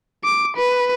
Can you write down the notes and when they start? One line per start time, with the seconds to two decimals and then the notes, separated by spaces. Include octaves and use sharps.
0.24 D6
0.57 B4